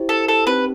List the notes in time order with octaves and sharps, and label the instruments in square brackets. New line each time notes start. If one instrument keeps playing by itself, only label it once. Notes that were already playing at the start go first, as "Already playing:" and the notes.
Already playing: [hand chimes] E4 G4 C5
[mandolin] A4
A4
[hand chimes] C4 D#4 G4 [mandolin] B4